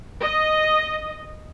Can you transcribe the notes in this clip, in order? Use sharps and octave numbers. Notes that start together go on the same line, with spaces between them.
D#5